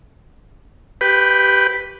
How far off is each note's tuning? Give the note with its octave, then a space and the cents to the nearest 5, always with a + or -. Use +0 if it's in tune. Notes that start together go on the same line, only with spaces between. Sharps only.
G4 -15 B4 +0 G5 +10